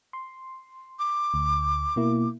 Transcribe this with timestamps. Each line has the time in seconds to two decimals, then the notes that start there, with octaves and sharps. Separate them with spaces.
0.13 C6
0.99 D6
1.34 D2
1.96 B2 A#3 E4